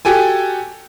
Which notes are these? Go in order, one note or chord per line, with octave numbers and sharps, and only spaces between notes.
F#4 G4 A4 G#5